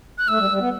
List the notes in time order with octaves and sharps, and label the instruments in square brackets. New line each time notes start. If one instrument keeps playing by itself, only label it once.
[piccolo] F#6
[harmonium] A3 [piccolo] E6
[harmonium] G3
G3
B3